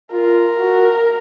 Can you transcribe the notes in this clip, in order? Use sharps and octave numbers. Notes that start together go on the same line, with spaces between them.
F4 A#4
F#4